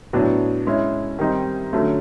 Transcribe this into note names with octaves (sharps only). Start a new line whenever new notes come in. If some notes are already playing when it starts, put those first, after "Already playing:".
A2 F#3 B3 D4
G#3 C#4 E4
D#3 G3 C4 D#4
D3 F#3 A3 C#4